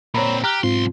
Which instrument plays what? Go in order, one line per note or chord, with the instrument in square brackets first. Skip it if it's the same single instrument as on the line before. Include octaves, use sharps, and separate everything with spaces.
[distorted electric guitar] A#2 C4 [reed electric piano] C#5 A#5 B5
[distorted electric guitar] G4 [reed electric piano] A#5 F6 F#6
[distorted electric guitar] B1 C6 [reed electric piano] G#2 C4 F4